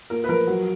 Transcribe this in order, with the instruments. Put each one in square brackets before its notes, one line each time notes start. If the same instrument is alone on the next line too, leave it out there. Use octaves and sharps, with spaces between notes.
[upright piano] A#2 A#4
B4
F3 A#4
F#3